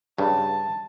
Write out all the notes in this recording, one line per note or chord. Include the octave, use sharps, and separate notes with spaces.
G2 C#3 A5